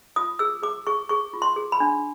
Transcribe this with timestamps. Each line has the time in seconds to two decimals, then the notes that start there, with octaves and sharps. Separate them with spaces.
0.16 F4 D#6
0.39 G#4 E6
0.62 G#4 D6
0.87 G#4 C#6
1.09 G#4 C#6
1.33 F4
1.42 C6
1.56 G#4
1.72 B5
1.80 D4